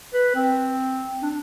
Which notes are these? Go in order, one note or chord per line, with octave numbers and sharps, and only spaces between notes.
B4
C4
D4